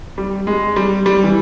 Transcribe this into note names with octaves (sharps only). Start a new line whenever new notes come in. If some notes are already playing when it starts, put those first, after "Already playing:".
G3
G#3
G3
G3
E3